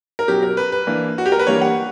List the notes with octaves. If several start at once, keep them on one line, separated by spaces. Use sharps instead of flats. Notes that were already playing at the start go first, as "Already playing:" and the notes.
A#4
B2 F#3 C#4 G4
A#4
B4
B4
E3 A#3 D4
F#4
G4
A#4
B4
E3 G3 A#3 D4 C#5
F#5